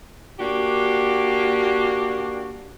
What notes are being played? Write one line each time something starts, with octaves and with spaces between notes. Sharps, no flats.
A#3 D4 F#4 G4